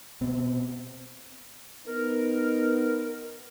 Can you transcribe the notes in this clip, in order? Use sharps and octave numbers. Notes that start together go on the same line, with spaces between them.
B2 C4
B3 D#4 A#4